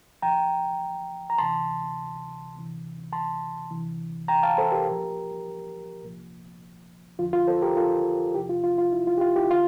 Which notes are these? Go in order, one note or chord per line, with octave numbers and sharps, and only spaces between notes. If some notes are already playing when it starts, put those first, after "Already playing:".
C2 A#2 F3 G5 A#5
A#5
D2 C3 E3 A5 C6
D2 C3 E3
A5 C6
D2 C3 E3
G5 A#5
F5 A5
A4 C5
G4 A#4
C2 A#2 F3
C2 A#2 F3
F2 D3 F3 F4
F4
A4 C5
G4 A#4
F4 A4
E2 C3 F3 E4 G4
F4
F4
F4
E4
F4
G4
F4
E4 G4
D3 F4